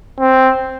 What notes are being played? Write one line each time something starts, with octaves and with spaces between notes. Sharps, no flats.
C4